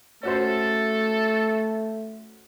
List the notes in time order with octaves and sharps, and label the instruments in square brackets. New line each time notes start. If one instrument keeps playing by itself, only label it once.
[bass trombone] A3 [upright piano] C#4 F#4 C5 [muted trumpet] A4